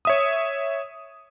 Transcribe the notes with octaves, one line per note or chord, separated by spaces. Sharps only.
C#5 E5 D#6